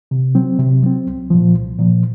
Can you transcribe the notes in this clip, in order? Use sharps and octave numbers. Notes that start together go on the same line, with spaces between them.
C3
F#3 C4
C3
F#3 C4
C2
A#2 F3
C2
A#2 F3